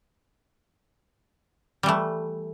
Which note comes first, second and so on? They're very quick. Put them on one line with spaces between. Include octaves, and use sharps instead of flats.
G3 E3 A3